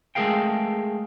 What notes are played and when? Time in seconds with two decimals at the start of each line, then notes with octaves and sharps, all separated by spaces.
0.15 G#3 A3 G#4 A#4 F5 G5